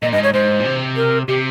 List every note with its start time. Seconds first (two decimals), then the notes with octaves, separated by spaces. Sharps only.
0.02 A#2 D#5
0.12 G2 D#5
0.18 G#2
0.23 C#5
0.33 G#2 C5
0.59 A#2
0.65 C3
0.96 A#4
1.28 C3 G4